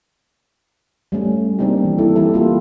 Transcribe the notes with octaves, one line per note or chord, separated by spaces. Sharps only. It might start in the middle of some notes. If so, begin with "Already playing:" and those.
G3 A3 C#4
G3 A#3 C4 D4 D#4 G4
E3
E4 A4
E3 G3 E4 G4 A4
A#3 F4 G4